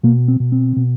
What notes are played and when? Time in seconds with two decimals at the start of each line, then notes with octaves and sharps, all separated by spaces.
0.03 B2 A#3
0.28 C4
0.40 B2
0.52 C4
0.76 B2